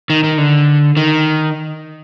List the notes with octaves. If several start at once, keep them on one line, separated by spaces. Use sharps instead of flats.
D#3
D#3
D3
D#3